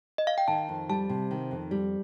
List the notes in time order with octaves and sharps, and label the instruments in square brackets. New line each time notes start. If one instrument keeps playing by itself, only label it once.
[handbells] D#5
F5
G5
[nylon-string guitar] D#3 [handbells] A5
[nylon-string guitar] F2
[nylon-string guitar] G3 [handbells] A5
[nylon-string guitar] C3
D#3
F2
G3